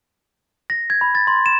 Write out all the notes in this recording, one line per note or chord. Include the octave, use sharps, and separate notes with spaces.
A#6
G#6
B5
A6
C6
E7